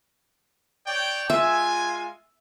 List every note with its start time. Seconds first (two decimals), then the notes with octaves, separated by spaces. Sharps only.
0.87 C#5 D5 G5
1.30 G#3 F4 E5 G#5